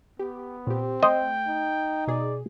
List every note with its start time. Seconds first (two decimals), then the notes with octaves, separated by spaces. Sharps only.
0.19 B3 G4
0.67 A#2 C4 G4
1.03 A3 C5 D#5 G5
1.47 D#4
2.07 B2 G#4 D5